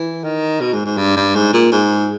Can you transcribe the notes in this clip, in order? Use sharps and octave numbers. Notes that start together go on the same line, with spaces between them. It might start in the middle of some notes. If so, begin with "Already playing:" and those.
Already playing: E3
D#3
B2
G#2
G#2
G2
G2
G#2
A#2
G#2